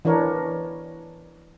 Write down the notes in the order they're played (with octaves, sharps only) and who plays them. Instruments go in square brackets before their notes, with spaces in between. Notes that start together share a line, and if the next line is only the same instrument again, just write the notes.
[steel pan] E3 D4 E4 A#4 C#5